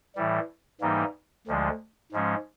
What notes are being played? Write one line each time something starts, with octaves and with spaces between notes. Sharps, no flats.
A2 E3 G3
G#2 E3 G3 A#3 D#4
D2 D3 F3 G#3
G#2 F3 G#3 C#4